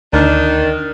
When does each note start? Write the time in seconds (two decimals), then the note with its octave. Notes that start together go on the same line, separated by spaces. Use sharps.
0.13 D2 D#3 D4